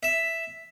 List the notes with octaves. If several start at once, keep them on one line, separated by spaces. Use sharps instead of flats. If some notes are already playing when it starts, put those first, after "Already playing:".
E5